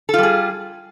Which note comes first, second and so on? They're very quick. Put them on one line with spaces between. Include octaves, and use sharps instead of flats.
A4 F4 G3 G#4